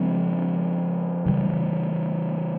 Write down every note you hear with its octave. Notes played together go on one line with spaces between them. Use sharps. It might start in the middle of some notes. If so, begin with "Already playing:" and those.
Already playing: C#3 F3 G#3 C4
C#3 E3 G3